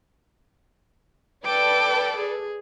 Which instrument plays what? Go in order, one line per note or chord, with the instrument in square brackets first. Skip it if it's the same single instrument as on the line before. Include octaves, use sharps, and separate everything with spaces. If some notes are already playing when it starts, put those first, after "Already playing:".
[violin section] A4 B4 D5 [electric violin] G5 D6
[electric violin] G#4